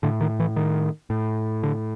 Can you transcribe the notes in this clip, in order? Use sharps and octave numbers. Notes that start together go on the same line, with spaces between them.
A2 D3
D#3
E3
D#3
A2
D3